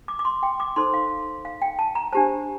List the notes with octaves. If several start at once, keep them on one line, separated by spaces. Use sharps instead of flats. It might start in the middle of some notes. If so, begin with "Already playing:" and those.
D6
D6
C6
G5
D6
D#4 A4 C5 C6
F5
F5
G5
A5
A#5
D4 G4 C5 A5